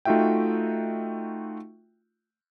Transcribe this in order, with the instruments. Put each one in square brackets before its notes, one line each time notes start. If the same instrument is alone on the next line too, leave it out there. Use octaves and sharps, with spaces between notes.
[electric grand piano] A3 D#4 F4 F#4 E5 G5